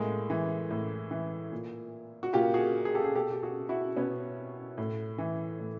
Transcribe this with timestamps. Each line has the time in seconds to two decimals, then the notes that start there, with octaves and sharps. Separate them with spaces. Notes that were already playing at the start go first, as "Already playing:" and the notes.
Already playing: A2 G#3 A#3
0.30 E3
0.71 A2
1.11 E3
1.52 A#2
2.23 F#4
2.33 A#2 F4 G4
2.54 F#4 G#4
2.85 G#4
2.95 G4 A4
3.05 G#4
3.15 B2 G4 A4
3.32 G4
3.43 F#4 G#4
3.69 E4 F#4
3.96 B2 B3 C#4
4.78 A2
5.18 E3
5.60 A2